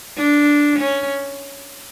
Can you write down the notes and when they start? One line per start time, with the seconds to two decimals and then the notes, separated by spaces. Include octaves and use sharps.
0.17 D4
0.79 C#4